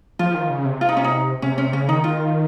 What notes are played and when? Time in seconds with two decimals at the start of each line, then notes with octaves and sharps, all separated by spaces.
0.19 F3 F4
0.34 D#3
0.50 C#3
0.65 C3
0.81 F4
0.89 D#4
0.97 C#4
1.04 D#4
1.42 C3 C#4
1.58 C#4
1.73 C#3 C#4
1.89 D#3 D#4
2.04 F4